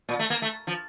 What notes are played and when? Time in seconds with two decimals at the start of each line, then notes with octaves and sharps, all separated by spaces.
0.09 A#2
0.19 A3
0.30 A#3
0.42 A3
0.67 F3